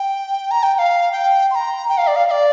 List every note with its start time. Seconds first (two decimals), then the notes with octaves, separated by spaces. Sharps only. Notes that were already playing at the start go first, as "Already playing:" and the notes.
Already playing: G5
0.51 A#5
0.63 G5
0.75 G5
0.79 F5
1.12 G5
1.51 C6
1.55 A#5
1.89 G5
1.98 F5
2.07 D5
2.16 F5
2.26 F5
2.31 D5